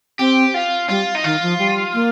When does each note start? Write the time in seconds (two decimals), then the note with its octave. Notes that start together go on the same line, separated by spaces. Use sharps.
0.19 C4 G4
0.54 F4
0.89 G3 F4
1.15 D#4
1.24 D#3 F4
1.42 F3
1.59 G3
1.94 A#3